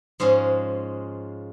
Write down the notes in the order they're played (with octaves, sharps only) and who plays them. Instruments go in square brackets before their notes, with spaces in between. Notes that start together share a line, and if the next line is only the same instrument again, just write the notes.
[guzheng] G#2 F3 G#3 C#4 G#4